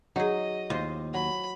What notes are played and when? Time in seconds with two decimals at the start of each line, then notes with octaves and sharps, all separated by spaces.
0.16 F#3 D#4 G#4 D#5
0.70 D#2 F4 C5
1.14 F#3 B5